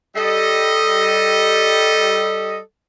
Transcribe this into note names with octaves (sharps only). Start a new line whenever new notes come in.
G3 A4 D#5